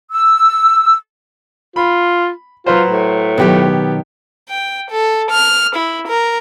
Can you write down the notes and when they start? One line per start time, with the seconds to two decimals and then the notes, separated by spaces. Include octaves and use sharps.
0.12 E6
1.76 F4 B5
2.66 F#3 F4 B4 C5
2.89 A2
3.38 B2 D#3 F#3 B3 G4
4.49 G5
4.90 A4
5.31 F6
5.75 E4
6.07 A#4